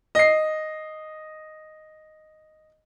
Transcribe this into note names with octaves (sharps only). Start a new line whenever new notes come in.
D#5 C7